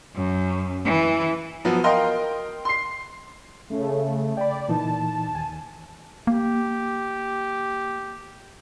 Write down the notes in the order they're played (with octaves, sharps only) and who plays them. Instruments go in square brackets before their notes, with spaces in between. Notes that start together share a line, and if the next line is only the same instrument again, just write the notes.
[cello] F#2
E3
[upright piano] F3 F#3 B3
A#4 D#5 F5 G5 C6
C6 C7
[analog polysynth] C#3 A3
[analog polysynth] D5 [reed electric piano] G5 B5
[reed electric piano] A#2 E3 D#4 [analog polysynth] A5
[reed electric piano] D#2 G#5
[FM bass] A#3 [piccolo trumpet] G4